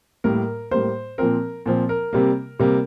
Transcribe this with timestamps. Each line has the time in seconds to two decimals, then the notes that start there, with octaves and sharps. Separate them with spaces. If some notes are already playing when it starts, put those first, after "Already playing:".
0.24 A2 G3 A#3 A#4
0.71 A2 G3 A#3 C5
1.18 A#2 F3 C4 A#4
1.66 A#2 F3 C4
1.89 A#4
2.13 C3 G3 A#3
2.59 C3 G3 A#3